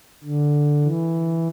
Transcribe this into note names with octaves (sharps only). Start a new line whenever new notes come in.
D3
E3